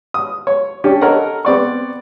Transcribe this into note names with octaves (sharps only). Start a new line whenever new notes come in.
D#6
C#5
C#4 D4 G4
A4 A#4 C#5 D#5 F#5
B3 C4 D5 C#6